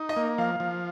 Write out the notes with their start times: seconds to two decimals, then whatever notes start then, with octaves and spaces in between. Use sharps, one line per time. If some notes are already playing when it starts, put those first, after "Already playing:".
Already playing: D#4
0.09 D#5
0.16 A#3
0.38 F3 F5
0.60 F3